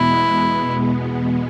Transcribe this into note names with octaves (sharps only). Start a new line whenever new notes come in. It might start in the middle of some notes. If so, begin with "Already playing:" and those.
Already playing: E2 B2 G#3 B3 E4